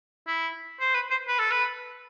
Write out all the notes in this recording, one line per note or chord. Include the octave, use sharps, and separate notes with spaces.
E4
C5
B4
C5
B4
A4
B4